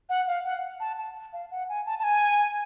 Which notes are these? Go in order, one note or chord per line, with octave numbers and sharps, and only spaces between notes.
F#5
F5
F#5
A5
A5
F5
F#5
G#5
A5
A5
G#5